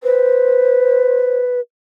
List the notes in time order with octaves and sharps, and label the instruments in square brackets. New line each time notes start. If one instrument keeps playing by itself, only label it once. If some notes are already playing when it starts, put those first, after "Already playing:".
[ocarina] B4 [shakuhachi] C5